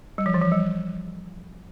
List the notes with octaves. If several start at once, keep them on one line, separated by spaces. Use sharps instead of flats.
G3
F3
E3
F3
G3